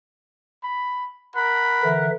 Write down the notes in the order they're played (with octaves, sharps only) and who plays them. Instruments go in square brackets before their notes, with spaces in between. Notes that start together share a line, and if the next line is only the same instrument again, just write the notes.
[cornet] B5
[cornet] A#4 [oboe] F#5 [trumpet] B5
[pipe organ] D3 E3 E5